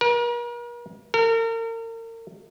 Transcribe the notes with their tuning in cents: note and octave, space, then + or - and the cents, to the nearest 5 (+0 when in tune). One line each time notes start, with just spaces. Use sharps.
A#4 +45
A#4 -35